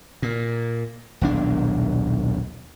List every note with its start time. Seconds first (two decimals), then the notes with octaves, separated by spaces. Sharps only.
0.22 A#2
1.21 D#1 B1 D4